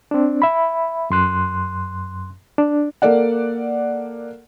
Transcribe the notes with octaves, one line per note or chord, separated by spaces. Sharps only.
C4 D4
E5 B5
F#2 C6 F#6
D4
A#3 A4 D5 F#5